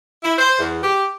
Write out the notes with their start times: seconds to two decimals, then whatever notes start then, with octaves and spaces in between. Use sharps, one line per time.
0.24 E4
0.38 C5
0.59 E2
0.83 G4